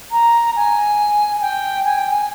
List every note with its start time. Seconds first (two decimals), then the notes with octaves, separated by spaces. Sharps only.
0.12 A#5
0.56 G#5
1.41 G5
1.85 G#5
1.98 G5
2.11 G#5